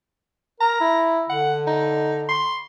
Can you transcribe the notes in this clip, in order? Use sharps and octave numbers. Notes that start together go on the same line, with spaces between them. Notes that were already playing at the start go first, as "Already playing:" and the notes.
A#4 A#5
E4
D3 F#5
D#4
C6